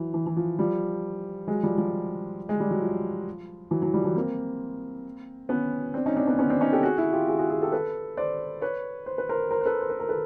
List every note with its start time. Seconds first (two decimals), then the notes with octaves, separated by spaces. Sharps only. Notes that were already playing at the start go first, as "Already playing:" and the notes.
Already playing: E3 F#3
0.14 E3
0.27 E3
0.36 F3
0.59 F3 G3
1.47 F#3 G#3
1.63 F3 G3
1.78 F3 G3
2.49 G#3
2.60 G3
2.71 F#3
2.82 F3
3.71 E3 F#3
3.82 E3 F#3
3.94 F3 G3
4.05 E3 F#3
4.15 A#3 C4
5.49 B3 C#4
5.94 C4 D4
6.06 C#4 D#4
6.17 C4 D4
6.27 B3 C#4
6.39 B3 C#4
6.50 C4 D4
6.61 C#4 D#4
6.72 G4 A4
6.83 F#4 G#4
6.98 E4 F#4
7.13 F4 G4
7.28 F#4 G#4
7.39 F#4 G#4
7.50 F#4 G#4
7.62 G4 A4
7.72 A4 B4
8.17 C5 D5
8.61 B4 C#5
9.06 C5
9.18 B4
9.29 A#4 C5
9.51 A#4 C5
9.61 C5
9.66 A4 B4
9.81 C5
9.90 B4
10.00 A#4
10.09 A4 B4